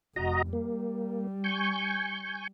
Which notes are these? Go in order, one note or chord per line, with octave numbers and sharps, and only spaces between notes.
F1 F#4 D#5 A#5
G3 A#3
G#5 C#6 G6